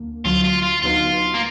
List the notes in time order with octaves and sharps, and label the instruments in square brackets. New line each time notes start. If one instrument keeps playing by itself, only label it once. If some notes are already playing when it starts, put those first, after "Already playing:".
Already playing: [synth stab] D2 D3 A#3
[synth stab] D2 D3 F#3 [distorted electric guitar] F4
[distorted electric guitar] F4
F4
[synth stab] D2 D3 F#3 B3 D#4 [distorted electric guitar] F4
[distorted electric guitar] A#3